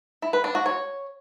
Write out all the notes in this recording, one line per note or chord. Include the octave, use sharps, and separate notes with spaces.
E4
B4
D4
F#4
C#5